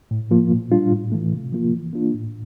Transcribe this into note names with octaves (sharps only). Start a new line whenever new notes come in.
A2
F3 A#3 F4
A#2
G3 D4 F4
A2
E3 A3
C3
F3 A#3 F4
E3
A#3 D4 F4
A2